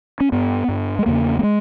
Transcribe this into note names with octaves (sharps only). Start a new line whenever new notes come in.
C#4
G2 B3
G2
G#3
E2 C#3 A#3
A#3
G#3